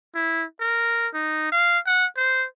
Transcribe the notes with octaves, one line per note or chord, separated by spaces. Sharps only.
E4
A#4
D#4
F5
F#5
C5